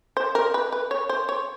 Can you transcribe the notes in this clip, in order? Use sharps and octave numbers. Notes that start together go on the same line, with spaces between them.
C5
A#4
B4
B4
C#5
C5
C#5